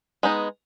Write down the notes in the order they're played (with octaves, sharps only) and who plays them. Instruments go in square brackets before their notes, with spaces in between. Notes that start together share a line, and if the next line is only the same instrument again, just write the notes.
[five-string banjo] G#3 B3 D#4